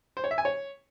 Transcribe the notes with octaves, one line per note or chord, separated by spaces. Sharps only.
C5
C#5
E5
G#5
C#5